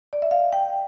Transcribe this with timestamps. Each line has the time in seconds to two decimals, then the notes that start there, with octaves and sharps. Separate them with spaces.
0.13 D5
0.22 E5
0.31 F5
0.52 G5